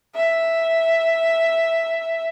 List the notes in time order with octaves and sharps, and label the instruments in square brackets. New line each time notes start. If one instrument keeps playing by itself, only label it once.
[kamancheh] E5